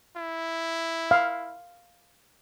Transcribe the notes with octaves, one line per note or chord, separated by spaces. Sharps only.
E4
F5